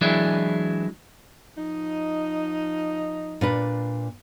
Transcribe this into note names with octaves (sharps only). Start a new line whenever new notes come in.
E3 F#3 G#3 D4 E4
F3 D#4
A#2 D4 B4